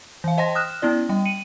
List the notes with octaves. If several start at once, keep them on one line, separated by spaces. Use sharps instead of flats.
E3 F5
C5 D#5 G5 A5 C6 A#6
D#6 F6 F#6 E7
B3 C#4 E4 D5
G3 G5
C#7 D#7 F#7